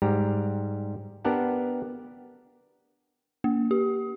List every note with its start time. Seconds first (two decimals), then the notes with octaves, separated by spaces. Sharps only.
0.02 G#2 G3 G4 A#5
1.25 B3 D4 G4 A#4 F#5 A5
3.44 A#3
3.71 G4